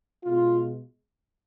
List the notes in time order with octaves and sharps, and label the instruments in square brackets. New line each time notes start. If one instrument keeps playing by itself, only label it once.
[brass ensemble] B2 G#3 F4